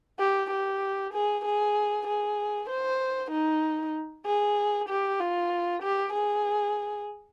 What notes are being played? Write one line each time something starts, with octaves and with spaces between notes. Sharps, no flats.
G4
G4
G#4
G#4
G#4
C5
D#4
G#4
G4
F4
G4
G#4